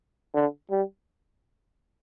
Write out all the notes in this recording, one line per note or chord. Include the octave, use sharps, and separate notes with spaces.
D3
G3